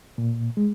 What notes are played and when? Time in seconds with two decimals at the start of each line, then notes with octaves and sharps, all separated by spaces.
0.18 A#2
0.57 G#3